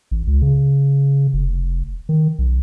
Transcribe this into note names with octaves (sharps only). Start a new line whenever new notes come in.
A1
C#2
C#3
F1
D#3
B1